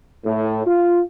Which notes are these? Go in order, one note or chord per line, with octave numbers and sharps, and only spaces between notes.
A2
F4